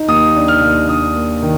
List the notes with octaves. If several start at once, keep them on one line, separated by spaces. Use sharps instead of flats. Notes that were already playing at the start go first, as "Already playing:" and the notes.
Already playing: D#4
D#2 D#6
D4
F6
D#2
D4 D#6
A#3
D#3